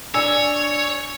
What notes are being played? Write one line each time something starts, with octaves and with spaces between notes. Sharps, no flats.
D4 C#5 G#5 E6